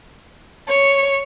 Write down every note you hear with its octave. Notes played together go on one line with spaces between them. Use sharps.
C#5